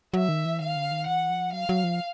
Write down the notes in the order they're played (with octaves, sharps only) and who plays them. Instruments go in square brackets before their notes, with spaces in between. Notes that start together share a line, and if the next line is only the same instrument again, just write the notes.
[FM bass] F#3 [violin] E5
[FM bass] D#3
E3
[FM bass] D#3 [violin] F5
[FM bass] D3
D#3
[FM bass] E3 [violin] F#5
[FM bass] F3
[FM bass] F#3 [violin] F5
[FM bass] F#3
F3